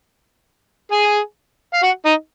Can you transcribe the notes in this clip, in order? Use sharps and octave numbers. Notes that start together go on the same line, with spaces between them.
G#4 G#5
F5
F#4 F#5
D#4 D#5